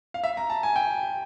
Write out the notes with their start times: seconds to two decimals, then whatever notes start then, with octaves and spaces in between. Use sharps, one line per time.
0.14 F5
0.24 E5
0.37 A#5
0.50 A5
0.63 G#5
0.76 G5